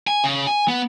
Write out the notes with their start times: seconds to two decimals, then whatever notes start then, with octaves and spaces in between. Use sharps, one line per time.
0.07 G#5
0.24 C#3
0.47 G#5
0.68 B3